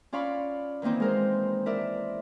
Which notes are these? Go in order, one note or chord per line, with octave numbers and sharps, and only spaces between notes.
C#4 F4 D5 F5 B5 C#6
D#3 E3 A#3 C4 D#4
G#3 A#4 C5
E4 A#4 D5 E5